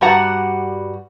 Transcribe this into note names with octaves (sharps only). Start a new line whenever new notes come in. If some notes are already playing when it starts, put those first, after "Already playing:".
G2 G3 F#4 F#5 A#5